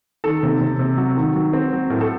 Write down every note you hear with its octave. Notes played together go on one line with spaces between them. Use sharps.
D#3 A4
C3
C3
C3
F#3
D#3
F#3
C4
F#3
A2 A#4
A4